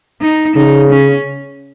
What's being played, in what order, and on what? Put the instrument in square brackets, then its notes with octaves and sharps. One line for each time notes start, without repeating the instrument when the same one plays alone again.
[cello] D#4
[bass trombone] C#3 [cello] D#4
[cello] C#4